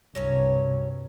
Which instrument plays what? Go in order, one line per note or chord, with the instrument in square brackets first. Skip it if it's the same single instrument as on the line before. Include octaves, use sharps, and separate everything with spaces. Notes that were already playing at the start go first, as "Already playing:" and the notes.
[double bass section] C2 G2 [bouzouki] F#3 C#4 C#5